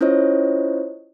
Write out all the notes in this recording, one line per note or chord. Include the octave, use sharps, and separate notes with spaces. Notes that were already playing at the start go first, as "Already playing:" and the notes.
C#4 E4 F4 C5 C#5 D#5